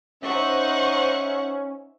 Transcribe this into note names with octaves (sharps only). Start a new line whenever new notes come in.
C#4 D#4 C5 E5 F#5 C#6